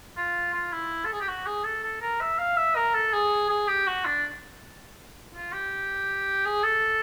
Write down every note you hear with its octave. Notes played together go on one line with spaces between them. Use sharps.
F4
F4
E4
A4
G#4
G4
F#4
G#4
A4
A4
A#4
E5
F5
E5
A#4
A4
G#4
G#4
G4
F#4
D4
F4
G4
G#4
A4